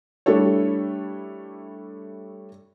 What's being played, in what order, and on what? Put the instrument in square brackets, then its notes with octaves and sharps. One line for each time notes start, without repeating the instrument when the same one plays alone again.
[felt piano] G3 A3 D4 E4 A4 C#5